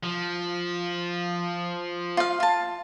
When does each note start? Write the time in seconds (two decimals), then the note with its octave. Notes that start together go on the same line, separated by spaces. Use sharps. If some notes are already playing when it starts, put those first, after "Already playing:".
0.03 F3
2.17 F4 F5
2.40 F4 A5